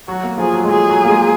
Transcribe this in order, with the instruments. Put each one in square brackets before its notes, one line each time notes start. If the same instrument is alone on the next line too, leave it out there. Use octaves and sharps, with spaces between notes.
[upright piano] F#3 [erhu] F#4
[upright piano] A#3
[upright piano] F3 [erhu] G#4
[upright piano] F#3
G#3
[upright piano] F#3 [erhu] G#4
[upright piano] F#3
A#3
G#3